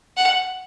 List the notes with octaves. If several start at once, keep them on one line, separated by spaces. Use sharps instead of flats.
F#5